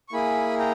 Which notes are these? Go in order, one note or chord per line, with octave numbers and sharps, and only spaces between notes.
C#6
A#3 E4 G#4 G#5 B5
G5 A#5